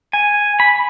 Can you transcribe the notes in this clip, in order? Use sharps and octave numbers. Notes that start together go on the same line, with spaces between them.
G#5
B5